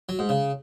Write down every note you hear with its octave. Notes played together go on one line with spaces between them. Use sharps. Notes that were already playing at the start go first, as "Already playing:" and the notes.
F#3
G#2
C#3